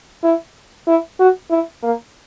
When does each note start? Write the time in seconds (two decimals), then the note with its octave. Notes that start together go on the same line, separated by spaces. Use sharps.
0.24 E4
0.87 E4
1.19 F#4
1.50 E4
1.83 A#3